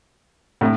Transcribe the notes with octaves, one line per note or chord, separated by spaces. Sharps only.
A2